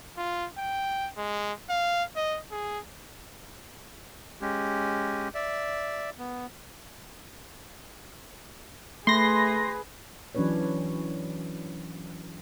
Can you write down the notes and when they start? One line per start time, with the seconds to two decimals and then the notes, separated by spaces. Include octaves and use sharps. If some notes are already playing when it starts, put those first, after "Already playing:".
0.17 F4
0.58 G5
1.17 G#3
1.69 F5
2.16 D#5
2.52 G#4
4.41 G#3 C#4 G4
5.34 D5 E5
6.19 B3
9.07 A3 G#4 B4 C6 A#6
10.35 E3 F#3 C#4 D4 B4 C#5